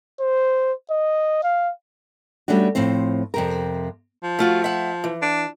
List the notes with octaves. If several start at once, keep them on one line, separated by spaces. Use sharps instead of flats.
C5
D#5
F5
G3 A3 C#4 D4 F#4
A2 F3 C4 C5
F2 C3 A#4
F3
A3 F4 F#4
E5 F#5
E3
D4